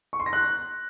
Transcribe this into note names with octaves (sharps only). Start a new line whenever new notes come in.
C#6
C6
A#6
F#6